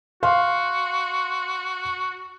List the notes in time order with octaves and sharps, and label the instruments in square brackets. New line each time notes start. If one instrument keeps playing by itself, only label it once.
[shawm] F#4 [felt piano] F5 C6